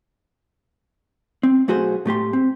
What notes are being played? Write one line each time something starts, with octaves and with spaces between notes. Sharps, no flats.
C4
B1 A3 F#4 G#4 C5
A2 A3 G4 C6
C4